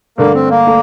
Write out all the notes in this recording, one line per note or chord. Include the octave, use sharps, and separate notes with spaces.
G2 D3 A3 A#3
C4
A#3
A3